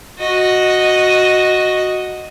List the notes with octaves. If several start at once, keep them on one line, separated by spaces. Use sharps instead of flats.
F#4 D#5